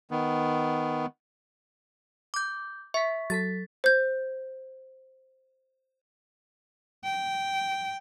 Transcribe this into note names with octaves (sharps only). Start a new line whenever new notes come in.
D#3 B3
D6 G6
E5 C#6 B6
F#3 A4 A6 B6
C5 G6
G5